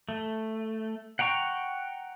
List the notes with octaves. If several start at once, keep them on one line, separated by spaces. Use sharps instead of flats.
A3
F#5 G5 A#5 C#6